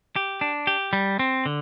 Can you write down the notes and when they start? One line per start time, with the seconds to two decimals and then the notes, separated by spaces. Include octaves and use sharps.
0.16 G4
0.41 D4
0.67 G4
0.93 G3
1.19 C4
1.46 D3